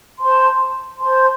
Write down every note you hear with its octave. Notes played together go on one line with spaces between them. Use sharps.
C5 A5 C6
C5 A5 C6